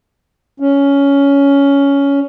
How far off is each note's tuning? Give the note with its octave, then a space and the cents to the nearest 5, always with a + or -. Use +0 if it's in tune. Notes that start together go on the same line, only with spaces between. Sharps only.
C#4 +10